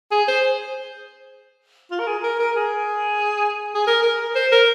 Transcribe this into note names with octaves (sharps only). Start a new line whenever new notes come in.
G#4
C5
F4
A#4
G#4
A#4
A#4
G#4
G#4
A#4
A#4
C5
A#4